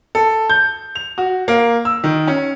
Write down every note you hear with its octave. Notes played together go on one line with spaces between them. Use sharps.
A4
G6
F7
F#4
A#3
E6
D#3
C#4